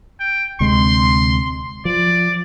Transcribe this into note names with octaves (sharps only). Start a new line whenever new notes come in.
G5
D2 C3 G#3 C6
F3 D5